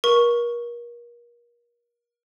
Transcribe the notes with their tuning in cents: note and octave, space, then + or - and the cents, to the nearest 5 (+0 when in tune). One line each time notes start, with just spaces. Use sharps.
A#4 +35 C#6 +0